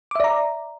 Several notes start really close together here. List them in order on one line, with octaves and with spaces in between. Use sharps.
D6 E5 D5 A#5